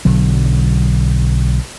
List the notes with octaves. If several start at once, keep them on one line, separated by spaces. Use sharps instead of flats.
B1 D3 F#3